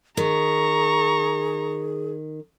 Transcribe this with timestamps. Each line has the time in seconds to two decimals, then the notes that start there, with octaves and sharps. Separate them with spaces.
0.17 D#3 G#4 A#5 C#6